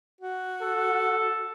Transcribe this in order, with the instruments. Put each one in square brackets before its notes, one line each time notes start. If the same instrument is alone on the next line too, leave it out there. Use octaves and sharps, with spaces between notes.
[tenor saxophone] F#4
[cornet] A4